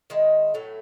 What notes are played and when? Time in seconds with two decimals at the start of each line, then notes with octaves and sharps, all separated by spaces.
0.10 D#3 G#3 E4
0.54 A2 F#3 A3